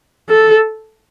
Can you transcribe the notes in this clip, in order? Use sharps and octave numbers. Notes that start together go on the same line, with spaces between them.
A4